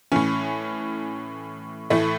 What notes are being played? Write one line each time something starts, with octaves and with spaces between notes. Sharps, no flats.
A2 E3 C#4
A2 E3 A3